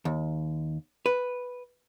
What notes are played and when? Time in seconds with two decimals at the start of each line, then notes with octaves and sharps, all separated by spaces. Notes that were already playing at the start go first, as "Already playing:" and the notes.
0.05 D#2
1.06 B4